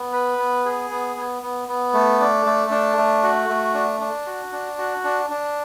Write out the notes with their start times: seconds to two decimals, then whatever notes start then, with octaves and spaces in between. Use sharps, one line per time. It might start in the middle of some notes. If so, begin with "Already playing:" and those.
Already playing: B3
0.13 B4
0.38 B3
0.65 G#4
0.90 B3
1.16 B3
1.42 B3
1.68 B3
1.93 A3
2.20 D4
2.46 A3
2.71 D4
2.97 A3
3.23 F#4
3.49 A3
3.74 D4
4.00 D4
4.27 F#4
4.52 D4
4.78 F#4
5.04 D4
5.30 D4